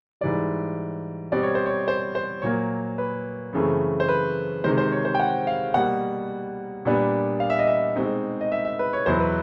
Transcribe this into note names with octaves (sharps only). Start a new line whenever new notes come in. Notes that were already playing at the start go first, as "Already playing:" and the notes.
G#2 E3 G3 D5
B2 G3 C4 D5
C#5
C5
C#5
C5
C5
A#2 F#3 A#3 C#5
B4
F#2 C#3 E3 A3 C4
C5
B4
C3 D#3 G#3 C5
C5
C#5
C5
G5
F#5
F5
B2 G3 A#3 F#5
A#2 G3 B3 D4
F5
E5
D#5
E5
B2 G#3 C4 D#4
D#5
E5
E5
B4
C#5
E2 B2 F#3 B3 E4 C5
B4